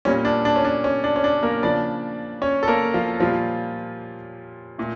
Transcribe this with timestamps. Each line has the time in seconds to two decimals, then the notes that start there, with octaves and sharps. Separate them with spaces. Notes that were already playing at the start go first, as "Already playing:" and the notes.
0.05 A#2 G3 A#3 C#4
0.25 D4
0.45 D4
0.56 C#4
0.64 D4
0.84 C#4
1.04 D4
1.16 C#4
1.24 D4
1.43 A#3 A#4
1.63 C#3 F3 A#3 D4 D5
2.42 C#4 C#5
2.63 A4
2.68 A#3 A#4
2.94 F3 F4
3.20 A#2 F3 G3 A#3 F4
4.78 A#2 A3